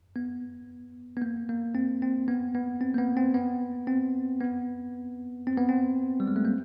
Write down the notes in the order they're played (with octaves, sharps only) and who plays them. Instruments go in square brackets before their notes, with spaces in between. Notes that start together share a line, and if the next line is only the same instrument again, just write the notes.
[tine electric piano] B3
B3
A#3
A#3
C4
C4
B3
B3
C4
A#3
B3
C4
B3
C4
B3
C4
B3
C4
G3
G#3
A3
A#3